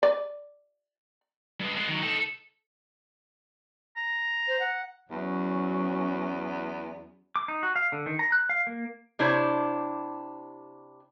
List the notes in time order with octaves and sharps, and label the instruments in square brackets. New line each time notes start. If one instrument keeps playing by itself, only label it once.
[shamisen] D5
[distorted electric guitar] G2 G#3
G#3 B3
D#3 F#3
D#4 A4
[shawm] A#5
[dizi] C5
F#5
[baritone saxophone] E2 [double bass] F#3 C#4
[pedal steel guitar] D6
D#4
F#4
F5
D3
D#3
A#5
F#6
F5
A#3
[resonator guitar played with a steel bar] C3 D4 E4 C5 C#5